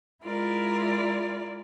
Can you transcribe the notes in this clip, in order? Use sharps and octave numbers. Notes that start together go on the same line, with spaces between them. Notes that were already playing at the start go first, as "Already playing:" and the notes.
G#3 E4 F4 A#4 D5